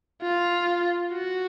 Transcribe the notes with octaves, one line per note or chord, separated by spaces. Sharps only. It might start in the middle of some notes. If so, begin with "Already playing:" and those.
F4
F#4